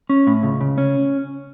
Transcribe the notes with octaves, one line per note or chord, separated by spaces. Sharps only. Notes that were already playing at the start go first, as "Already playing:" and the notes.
C#4
A2
C#2
C#3
C#4